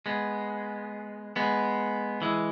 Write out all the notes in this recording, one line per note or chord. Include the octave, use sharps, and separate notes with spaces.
G#3 B3
G#3 B3
E3 G#3